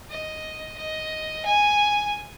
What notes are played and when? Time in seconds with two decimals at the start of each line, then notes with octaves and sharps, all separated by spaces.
0.11 D#5
0.78 D#5
1.46 G#5